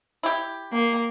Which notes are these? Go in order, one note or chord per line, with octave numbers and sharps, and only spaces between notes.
E4 G4
A#3